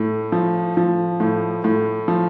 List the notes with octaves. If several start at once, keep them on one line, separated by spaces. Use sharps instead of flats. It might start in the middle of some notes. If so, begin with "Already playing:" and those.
Already playing: A2
F3
F3
A2
A2
F3